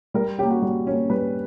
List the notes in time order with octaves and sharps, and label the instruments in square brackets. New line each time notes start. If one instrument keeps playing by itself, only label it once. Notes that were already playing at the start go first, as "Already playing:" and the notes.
[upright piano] G3 [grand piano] A#4
[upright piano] C#4 [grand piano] G4
[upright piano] A#3
[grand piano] F#4
[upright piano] G3
A#3 C#4
[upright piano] G3 [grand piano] B4